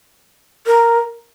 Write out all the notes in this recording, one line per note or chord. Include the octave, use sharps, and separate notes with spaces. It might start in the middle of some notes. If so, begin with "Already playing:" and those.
A#4